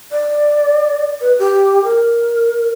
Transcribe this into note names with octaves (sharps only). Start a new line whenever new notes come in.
D5
B4
G4
A#4